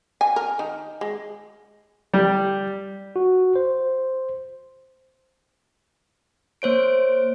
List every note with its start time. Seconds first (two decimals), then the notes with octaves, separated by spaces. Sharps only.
0.21 G#5
0.36 A#4
0.59 D#3
1.01 G#3
2.14 G3
3.16 F#4
3.55 C5
6.62 A#3 C5 C#5 D7